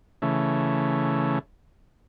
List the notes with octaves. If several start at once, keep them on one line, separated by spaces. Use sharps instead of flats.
C#3 E3 A3